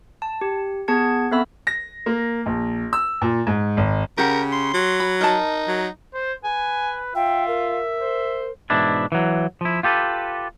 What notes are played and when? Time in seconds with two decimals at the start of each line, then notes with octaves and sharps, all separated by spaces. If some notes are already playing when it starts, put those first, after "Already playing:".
0.22 A5
0.41 G4
0.88 B3 G#4 A5 G#6 C#7
1.31 B3 C4 A4 E5 B5 E6
1.67 A#6
2.06 A#3
2.46 A#1
2.93 E6
3.22 A#2
3.47 G#2
3.77 G#1
4.18 C#3 G4 A#4 F#5
4.53 C6
4.74 F#3
5.00 B5
5.21 D#4 A#4 D#5 A5
5.68 F#3
6.14 C5
6.44 B4 G#5
7.15 F4 E5 G5
7.48 A#4
8.00 C5
8.70 G#2 B2 E3 D4 E4
9.12 E3 F#3
9.61 F3 E4
9.83 F4 G4 A4 B4